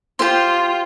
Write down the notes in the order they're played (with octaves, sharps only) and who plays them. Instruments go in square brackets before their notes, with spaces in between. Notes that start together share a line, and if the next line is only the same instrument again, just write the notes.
[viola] F4 [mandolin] G4 C5